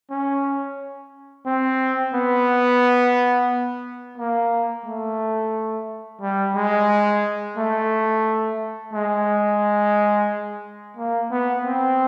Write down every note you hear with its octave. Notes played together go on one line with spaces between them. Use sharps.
C#4
C4
B3
A#3
A3
G3
G#3
A3
G#3
A#3
B3
C4